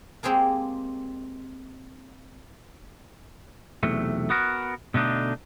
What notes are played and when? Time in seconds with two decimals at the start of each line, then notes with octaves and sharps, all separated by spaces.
0.23 G#3 A#3 C4 G4 G#4 A#4
3.83 B1 E2 C3 A3
4.30 B3 F#4 A#4
4.94 B2 D3 A3 D4 D#4